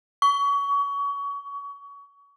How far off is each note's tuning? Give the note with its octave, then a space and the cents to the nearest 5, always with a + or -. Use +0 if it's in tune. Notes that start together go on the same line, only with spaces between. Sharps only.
C#6 +30